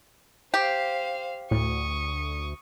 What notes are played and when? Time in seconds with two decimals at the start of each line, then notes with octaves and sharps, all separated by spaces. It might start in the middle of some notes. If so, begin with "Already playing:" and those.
0.54 G4 C5 F5
1.51 D2 A2 C#6 D#6